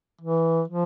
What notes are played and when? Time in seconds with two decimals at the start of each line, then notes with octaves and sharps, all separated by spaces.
0.21 E3
0.68 F3